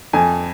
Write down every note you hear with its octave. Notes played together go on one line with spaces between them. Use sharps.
F2 G#5